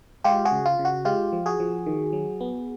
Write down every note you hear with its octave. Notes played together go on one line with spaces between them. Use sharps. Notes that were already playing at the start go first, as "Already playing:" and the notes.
G#3 F4 G4
F#4 G#4
C#3
F4
C#3
F#4
G#3 F4 G4
F3
F#4 G#4
F3
D#3
F#3
B3